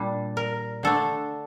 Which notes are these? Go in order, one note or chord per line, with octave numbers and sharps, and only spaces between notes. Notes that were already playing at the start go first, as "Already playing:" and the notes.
Already playing: A#2 G3 D4
A#4
D3 A3 D4 A4